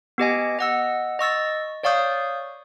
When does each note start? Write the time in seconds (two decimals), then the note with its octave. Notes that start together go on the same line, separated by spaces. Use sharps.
0.18 B3 G4 D#5 G#5
0.59 D#5 F#5 E6
1.19 D#5 C#6 E6 A6
1.83 C#5 D5 F5 C#6 D#6 G6